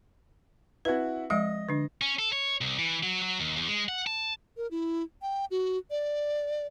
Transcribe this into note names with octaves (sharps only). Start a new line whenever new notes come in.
C4 E4 F#4 B4
F3 G#3 D#5 E5
D3 D4
C#4
A4
C#5
C2
E3
F#3
F#3
D#2
E2
G#3
F#5
A5
A#4
E4
G5
F#4
D5